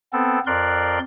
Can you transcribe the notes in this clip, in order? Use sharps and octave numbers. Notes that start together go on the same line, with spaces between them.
B3 C4 A4
F2 A#4 D5 C6 F#6